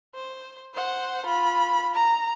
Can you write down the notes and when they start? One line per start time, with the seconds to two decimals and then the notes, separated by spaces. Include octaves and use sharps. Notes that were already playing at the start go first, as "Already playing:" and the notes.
0.15 C5
0.74 C5 F#5
1.26 F4 B5
1.95 A#5